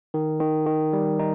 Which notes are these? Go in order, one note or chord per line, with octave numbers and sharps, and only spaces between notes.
D#3
D#3
D#3
G3
D#4